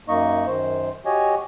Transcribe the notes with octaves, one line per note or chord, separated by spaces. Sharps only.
F#2 A#3 D#4 D#5 C#6
F#2 D#3 C5
F#4 G4 C#5 D#5 G#5